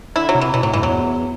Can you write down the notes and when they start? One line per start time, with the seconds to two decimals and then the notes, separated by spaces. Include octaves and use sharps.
0.16 D3 E4
0.29 F#3
0.35 C3
0.41 E3
0.54 B2 E3
0.63 A2 F#3
0.73 G2 E3
0.82 E2 F#3